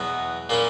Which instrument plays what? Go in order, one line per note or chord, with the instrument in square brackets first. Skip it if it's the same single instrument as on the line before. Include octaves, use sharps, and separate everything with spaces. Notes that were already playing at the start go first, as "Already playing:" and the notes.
Already playing: [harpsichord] E2 B2 F#3 B3
A#2 A#3 C#4 E4